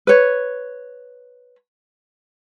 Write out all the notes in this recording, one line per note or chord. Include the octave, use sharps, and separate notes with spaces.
B4 C#5